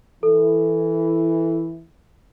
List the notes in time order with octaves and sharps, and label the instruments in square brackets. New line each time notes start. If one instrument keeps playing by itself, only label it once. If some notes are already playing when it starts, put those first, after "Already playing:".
[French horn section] E3 E4 [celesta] A4